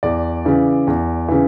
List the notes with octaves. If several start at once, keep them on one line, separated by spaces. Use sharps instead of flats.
E2 D5
C#3 E3
E2
C#3 E3